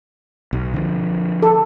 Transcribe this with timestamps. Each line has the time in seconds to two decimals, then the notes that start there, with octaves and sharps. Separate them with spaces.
0.53 B1
0.74 D3 D#3 F3
1.43 A4